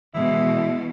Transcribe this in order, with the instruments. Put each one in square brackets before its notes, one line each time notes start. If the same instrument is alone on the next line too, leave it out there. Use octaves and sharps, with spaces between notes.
[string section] B2 [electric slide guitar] E3 G#3 [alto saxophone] E4